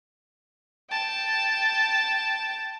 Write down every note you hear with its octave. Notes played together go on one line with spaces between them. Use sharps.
G5 A5